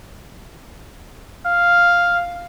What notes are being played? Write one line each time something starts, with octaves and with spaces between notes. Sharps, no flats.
F5